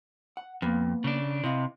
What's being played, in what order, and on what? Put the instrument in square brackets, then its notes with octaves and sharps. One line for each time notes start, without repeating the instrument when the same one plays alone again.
[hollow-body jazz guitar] F#5
[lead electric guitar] F2 [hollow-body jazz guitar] A#3 B3
[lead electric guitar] C#3 D4
[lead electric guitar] C3 [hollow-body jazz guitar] E4 D#5 F5